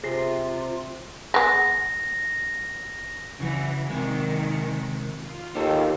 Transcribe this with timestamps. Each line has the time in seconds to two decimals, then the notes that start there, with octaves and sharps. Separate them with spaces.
0.04 C3 F4 G#4 A#6 C7
1.34 G#3 B3 A#6
3.40 C#3 E3 F#4
3.90 C3 D#3 G#3
5.17 F4
5.55 D#2 G4 A4 A5